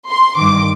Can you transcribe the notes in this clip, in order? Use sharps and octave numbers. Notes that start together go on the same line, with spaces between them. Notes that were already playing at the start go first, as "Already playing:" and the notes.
C6
G2 D#3 D6